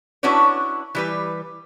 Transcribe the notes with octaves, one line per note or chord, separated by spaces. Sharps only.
C#4 D4 E4 F#4 B4 C#5
E3 G3 B4